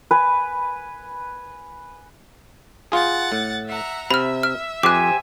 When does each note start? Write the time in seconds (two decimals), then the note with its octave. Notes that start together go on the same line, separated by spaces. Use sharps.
0.11 B4 G#5
2.92 F4 G#4 F#5 A6
3.32 A2
3.66 E5 F#5 A#5
4.11 C3 E5 B5 F6
4.43 F6
4.83 F2 G4 C5 G#5 D6 F#6